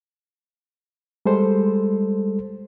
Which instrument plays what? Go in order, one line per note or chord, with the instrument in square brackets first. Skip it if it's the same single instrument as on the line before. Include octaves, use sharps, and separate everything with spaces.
[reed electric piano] G3 G#3 A4 C5